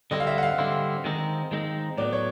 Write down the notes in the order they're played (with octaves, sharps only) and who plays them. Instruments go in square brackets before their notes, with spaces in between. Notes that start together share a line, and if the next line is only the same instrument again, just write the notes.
[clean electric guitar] D3 G3 C4 E4 [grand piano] D#5
[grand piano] F5
E5
F#5
F5
[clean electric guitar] D3 G3 C4 E4
D#3 G#3 C4 D#4
D#3 G#3 C4 D#4
[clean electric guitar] A2 F#3 B3 [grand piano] D5
[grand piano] C#5